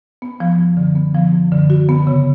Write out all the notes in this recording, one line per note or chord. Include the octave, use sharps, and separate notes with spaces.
B3
F3
F#2
D3
B3
F3
F#2
D3
F#4
B3
C#3